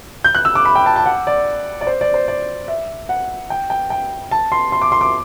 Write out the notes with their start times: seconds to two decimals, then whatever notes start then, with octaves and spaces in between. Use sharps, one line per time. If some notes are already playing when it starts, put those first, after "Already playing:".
0.24 G6
0.35 F#6
0.45 E6
0.55 D6
0.65 B5
0.75 G5
0.86 A5
0.96 A5
1.06 F#5
1.27 D5
1.81 D5
1.87 C5
2.01 D5
2.14 C5
2.28 D5
2.68 E5
3.09 F#5
3.50 G5
3.70 G5
3.90 G5
4.31 A5
4.52 C6
4.72 C6
4.82 D6
4.92 C6
5.01 D6